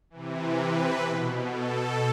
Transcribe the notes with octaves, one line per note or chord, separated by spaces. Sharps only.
C3 E3
B4
B2
A4